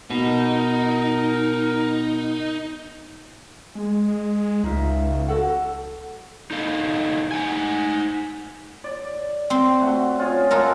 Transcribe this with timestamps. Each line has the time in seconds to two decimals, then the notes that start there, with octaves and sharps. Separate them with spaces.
0.10 B2 D#4 A#4
3.75 G#3
4.64 C#2 D#4 F4 E5
5.28 F#4 A4 F#5
6.51 D#4 E4 A4 D#5 F5
7.32 D#4 F#5 G#5
8.84 D5
9.50 C4 C6
9.80 A3 F#4
10.18 C#4 F4 G#4
10.51 F4 A4 A#4 D#5 F#5 G#5